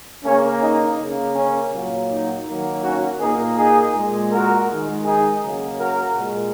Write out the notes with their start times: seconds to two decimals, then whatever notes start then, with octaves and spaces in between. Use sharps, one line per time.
0.24 C#3 A#3 C#4
0.62 D#4
0.98 C#3 A#3
1.35 C#4
1.73 A#2 F#3 A#3
2.09 D#4
2.47 D#3 F#3 A#3
2.83 C#4 F#4
3.20 A#2 A#3 D#4 G#4
3.57 D#4 G#4
3.94 A#2 G#3
4.31 F#4 A#4
4.69 D#3 G#3
5.05 D#4 G#4
5.42 C#3 F#3 A#3
5.79 F#4 A#4
6.16 A#2 G#3